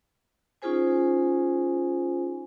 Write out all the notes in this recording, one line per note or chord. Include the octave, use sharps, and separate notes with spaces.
C#4 D#4 F4 G#4 C5 G#5